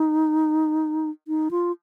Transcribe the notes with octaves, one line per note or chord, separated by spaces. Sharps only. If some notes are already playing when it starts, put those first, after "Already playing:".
Already playing: D#4
D#4
F4